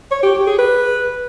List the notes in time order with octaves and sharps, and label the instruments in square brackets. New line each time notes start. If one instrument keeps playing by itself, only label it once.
[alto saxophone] C#5
G4
G4
G#4
B4